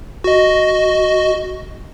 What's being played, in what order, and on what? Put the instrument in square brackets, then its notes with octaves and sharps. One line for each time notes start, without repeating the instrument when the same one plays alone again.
[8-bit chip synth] F#4 D#5